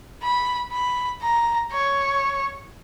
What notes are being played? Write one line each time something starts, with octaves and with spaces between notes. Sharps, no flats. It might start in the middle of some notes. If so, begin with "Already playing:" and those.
B5
B5
A#5
C#5